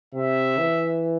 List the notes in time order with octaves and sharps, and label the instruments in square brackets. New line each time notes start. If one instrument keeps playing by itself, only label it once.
[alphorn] C3 [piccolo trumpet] E5
[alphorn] E3